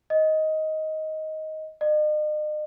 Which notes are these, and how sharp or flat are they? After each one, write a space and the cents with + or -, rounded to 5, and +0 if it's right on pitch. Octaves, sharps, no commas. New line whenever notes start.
D#5 +10
D#5 -40